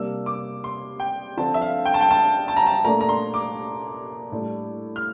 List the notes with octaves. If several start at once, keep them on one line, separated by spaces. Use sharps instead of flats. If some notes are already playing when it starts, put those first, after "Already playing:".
Already playing: C3 G3 A#3 D4 E6
D6
C6
G5
D3 F3 C4 A5
E5
F5
G5
A5
G5
A5
A5
A#5
A5
A#2 A3 D4 A#5
A#5
C6
D6
A2 G3 D4
F6